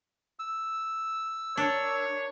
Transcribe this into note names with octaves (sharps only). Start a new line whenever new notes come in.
E6
D4 A#4 C#5